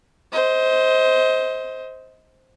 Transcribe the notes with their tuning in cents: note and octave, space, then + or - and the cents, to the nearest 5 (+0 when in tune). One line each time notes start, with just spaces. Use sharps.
C5 +0 D#5 +30